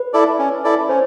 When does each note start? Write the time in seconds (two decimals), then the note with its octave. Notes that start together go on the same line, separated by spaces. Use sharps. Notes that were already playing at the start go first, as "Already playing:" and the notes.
Already playing: B4
0.13 E4 A4 D5
0.39 C#4
0.64 E4 A4 D5
0.89 C#4 C5